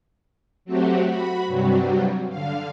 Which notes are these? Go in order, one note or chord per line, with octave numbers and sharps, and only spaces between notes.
F#3 A3 C4 F#4 G4
F#4 B5
G2 C3 F#3 G3 F#4
D3 F5